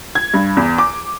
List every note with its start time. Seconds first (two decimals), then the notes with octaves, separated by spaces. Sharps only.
0.15 G#6
0.34 G2
0.57 E2
0.78 D6